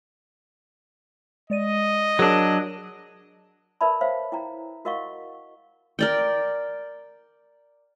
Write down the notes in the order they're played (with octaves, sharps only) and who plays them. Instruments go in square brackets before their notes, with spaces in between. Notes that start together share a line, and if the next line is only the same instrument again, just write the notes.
[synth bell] G#3 D5 D#7 [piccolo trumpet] D#5
[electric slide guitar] F#3 D4 [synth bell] G#4 A#4
[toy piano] A#4 B4 D5 E5 A5 B5
C5 C#5 E5 F5
E4 G5 A#5
F#4 A#4 D#5 F5 F#5 C#6
[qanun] A#4 D5 G5